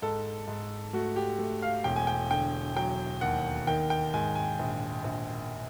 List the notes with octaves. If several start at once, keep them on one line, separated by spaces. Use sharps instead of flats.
G#2 A4
G#2
A3 F#4
G4
A3
F5
E1 G5
G#5
G5
D3 G5
F#3 G5
D#2 F#5
D#3 G5
G5
G#2 G#5
G#5
A#1
A#1